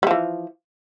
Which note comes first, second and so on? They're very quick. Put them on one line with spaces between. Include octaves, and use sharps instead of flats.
G3 F3 E3